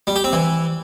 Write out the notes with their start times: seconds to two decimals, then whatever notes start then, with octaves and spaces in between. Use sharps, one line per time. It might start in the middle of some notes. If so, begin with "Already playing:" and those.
0.07 G3
0.16 G4
0.24 C4
0.33 E3